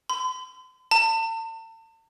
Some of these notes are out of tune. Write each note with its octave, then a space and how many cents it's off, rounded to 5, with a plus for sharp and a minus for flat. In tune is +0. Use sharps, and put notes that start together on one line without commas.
C6 -45
A5 +40